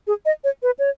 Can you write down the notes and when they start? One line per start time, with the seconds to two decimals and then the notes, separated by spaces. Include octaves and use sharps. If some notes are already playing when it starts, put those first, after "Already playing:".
0.07 G#4
0.25 D#5
0.44 C#5
0.63 B4
0.79 C#5